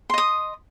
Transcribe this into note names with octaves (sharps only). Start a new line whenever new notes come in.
D#5 C6 D#6